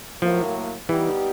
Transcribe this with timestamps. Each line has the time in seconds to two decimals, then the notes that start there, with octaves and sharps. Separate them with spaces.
0.22 A2 F3 F#3 A#3
0.88 E3 G3 B3 D#4 G4